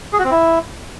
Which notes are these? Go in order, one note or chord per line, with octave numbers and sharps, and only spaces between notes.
G#4
F#4
C4
E4